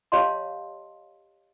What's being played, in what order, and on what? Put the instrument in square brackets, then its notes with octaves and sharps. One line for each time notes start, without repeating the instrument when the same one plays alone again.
[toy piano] G4 C#5 D#5 F5 A5 C6